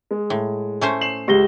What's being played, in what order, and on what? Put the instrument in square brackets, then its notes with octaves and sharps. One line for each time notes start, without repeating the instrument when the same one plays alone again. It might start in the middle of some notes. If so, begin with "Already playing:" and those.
[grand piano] G#3
[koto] A2
A3 C#4 C5
[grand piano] C7 E7 F#7
[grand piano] C#2 [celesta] G4 A#6 G7